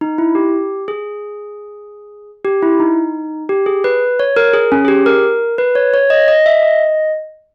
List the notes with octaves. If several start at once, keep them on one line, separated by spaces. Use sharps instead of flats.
D#4
E4
G4
G#4
G4
E4
D#4
G4
G#4
B4
C#5
A#4
G#4
C#4
G#4
G4
A#4
B4
C#5
C#5
D#5
D#5
E5
D#5